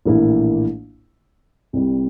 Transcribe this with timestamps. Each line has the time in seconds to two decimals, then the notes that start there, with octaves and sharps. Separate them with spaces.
0.05 A#1 A2 E3 A#3 E4
1.73 C2 C3 G3